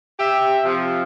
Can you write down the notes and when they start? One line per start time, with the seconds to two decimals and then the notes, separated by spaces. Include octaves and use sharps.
0.20 G4 E5
0.64 C3 F3